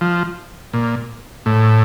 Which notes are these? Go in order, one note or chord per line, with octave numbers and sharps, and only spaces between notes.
F3
A#2
A2